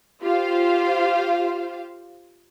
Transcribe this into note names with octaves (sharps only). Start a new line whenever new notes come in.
F4 G4 C5 F5